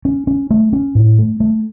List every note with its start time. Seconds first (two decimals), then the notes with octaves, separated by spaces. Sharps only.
0.05 C#4
0.27 C#4
0.51 A3
0.73 C#4
0.95 A2
1.19 A3
1.40 A3